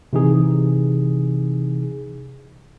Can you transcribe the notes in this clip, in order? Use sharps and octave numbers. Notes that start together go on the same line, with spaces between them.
C3 E3 D#4 G#4